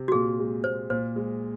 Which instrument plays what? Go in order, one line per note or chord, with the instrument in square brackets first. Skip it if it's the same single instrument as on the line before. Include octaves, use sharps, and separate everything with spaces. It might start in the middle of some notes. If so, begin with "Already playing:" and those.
Already playing: [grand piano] C3
[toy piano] F#4
[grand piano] A#2 [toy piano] G#4
[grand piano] G#3
[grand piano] A#2 [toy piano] C5
[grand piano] A#2 [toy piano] C5
[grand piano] G#3